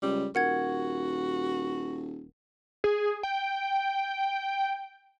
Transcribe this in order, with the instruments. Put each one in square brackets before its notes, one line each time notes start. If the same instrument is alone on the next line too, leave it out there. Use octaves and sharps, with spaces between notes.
[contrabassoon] C#2 [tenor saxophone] G3
[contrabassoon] D#1 [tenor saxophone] F#4 [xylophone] A#4 F#5 G#6
[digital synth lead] G#4
G5